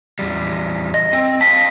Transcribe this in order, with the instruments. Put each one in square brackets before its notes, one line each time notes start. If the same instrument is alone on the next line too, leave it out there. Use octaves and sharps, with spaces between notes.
[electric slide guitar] E2 G3
[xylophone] D#5
[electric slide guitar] C4
[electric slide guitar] D#5 F5 A5 [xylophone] B6